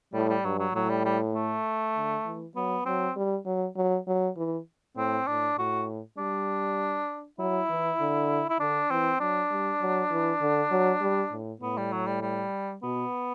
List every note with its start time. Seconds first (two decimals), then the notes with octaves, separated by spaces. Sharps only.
0.14 A2 G3
0.29 G3
0.44 G2 F#3
0.59 F#3
0.74 A2 F#3
0.90 G3
1.05 G3
1.35 A3
1.95 D3
2.26 E3
2.56 F#3 B3
2.85 F#3 C4
3.16 G3
3.46 F#3
3.76 F#3
4.07 F#3
4.37 E3
4.97 A2 C4
5.27 A2 D4
5.58 A2 F#4
6.18 G3 D4
7.39 F#3 E4
7.70 E3
8.00 D3
8.49 E4
8.60 D3 D4
8.91 E3 C4
9.20 F#3 D4
9.50 G3
9.81 F#3
10.11 E3
10.41 D3
10.71 F#3
11.01 G3
11.31 A2
11.61 A2 B3
11.77 G3
11.92 F#3
12.07 G3
12.22 G3
12.83 B2 B3